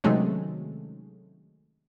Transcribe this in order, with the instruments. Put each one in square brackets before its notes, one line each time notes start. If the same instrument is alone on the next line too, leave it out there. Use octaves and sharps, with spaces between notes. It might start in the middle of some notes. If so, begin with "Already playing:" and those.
[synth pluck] C3 D#3 F#3 G#3 A3 C#4